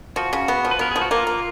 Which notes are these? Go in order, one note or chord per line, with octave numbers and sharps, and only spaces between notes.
F3 F#4
C#3
B3
F3
B4
B3 A#4
F3 G#4
F#4
A#3 F4
A#3